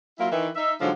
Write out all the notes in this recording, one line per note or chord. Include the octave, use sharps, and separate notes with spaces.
F#3 A#3 E4 F4
D#3 E3
D#4 E5
G#2 D3 F3 F#3